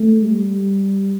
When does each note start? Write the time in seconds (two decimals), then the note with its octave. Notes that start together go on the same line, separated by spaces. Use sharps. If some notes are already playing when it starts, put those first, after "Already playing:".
Already playing: A3
0.24 G3